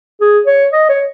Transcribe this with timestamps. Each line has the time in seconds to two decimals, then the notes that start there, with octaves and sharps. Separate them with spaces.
0.21 G#4
0.46 C#5
0.72 D#5
0.89 C#5